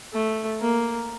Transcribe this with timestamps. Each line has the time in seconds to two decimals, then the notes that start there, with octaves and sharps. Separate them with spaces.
0.13 A3
0.61 A#3